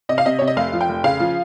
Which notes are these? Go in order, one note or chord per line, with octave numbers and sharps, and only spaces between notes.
C3 D#5
F5
C3 D#5
C3 C#5
D#5
F1 F5
F3
G5
F1
C#3 F5
F3